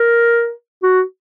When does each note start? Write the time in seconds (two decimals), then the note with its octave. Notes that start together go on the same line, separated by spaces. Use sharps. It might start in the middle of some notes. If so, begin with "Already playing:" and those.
Already playing: A#4
0.83 F#4